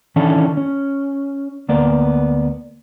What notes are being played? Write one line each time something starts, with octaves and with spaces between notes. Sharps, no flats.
D#3 E3 C#4 D4 E4 A4
C#4
D2 A#3 B3 D5